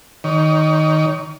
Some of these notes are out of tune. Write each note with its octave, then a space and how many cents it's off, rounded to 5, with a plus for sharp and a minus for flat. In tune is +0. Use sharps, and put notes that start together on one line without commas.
D#3 +0 C#5 +35